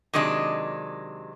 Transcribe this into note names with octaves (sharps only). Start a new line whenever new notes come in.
C3 D#3 F#3 G#3 D4